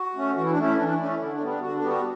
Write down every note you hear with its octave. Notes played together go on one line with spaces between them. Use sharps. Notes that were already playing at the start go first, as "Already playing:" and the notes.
Already playing: F#4
A3 C#4
E3 F#4
E4
D4
A3 C#4 E4
E3 D4
D4
A3 C#4 D4
E4
D3 E4
D4
G3 B3
D4
D3 F#4
D4
G3 B3 G4
F#4